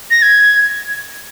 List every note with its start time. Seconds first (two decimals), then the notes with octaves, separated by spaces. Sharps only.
0.11 A#6
0.22 G#6